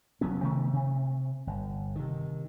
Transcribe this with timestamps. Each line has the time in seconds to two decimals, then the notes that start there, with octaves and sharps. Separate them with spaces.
0.21 F1 F#3 B3 C#4
0.42 C3 D#3 A3 B3
0.73 C3
1.47 G1
1.96 C3 D#3